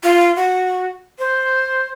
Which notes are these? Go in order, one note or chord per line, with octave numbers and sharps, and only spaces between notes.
F4
F#4
C5